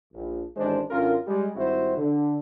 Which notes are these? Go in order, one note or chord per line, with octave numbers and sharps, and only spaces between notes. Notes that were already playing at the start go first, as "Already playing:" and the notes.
A#1
A1 D#3 G#3 D4 C5
F#2 D3 C#4 F4 A#4
G3 G#3
G#1 G3 C4 E4 F#4 C5
D3